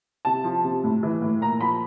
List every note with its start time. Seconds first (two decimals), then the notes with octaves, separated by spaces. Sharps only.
0.25 C3 A5
0.44 F3
0.64 C3
0.84 A2
1.03 E3
1.22 A2
1.41 A#2 A#5
1.61 F3 B5